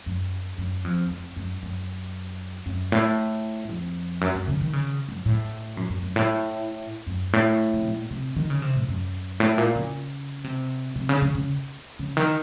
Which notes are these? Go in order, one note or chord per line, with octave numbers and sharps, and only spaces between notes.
F#2
F#2
F2
F2
F#2
F#2
F#2
A2
F2
F#2
F#2
C#3
D#3
C#3
F#2
A2
F#2
F#2
F#2
A2
F#2
A2
C3
A#2
C3
D#3
C#3
C3
A2
F#2
A2
A#2
C#3
C3
C3
C#3
C#3
C#3
C#3
D#3